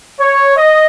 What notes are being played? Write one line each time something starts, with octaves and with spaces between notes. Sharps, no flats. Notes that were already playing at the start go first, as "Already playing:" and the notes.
C#5
D#5